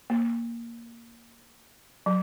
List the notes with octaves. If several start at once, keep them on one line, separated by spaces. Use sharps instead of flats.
A#3
F#3